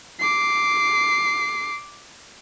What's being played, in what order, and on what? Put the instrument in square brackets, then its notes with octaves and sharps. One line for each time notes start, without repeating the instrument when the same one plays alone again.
[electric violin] D6 C7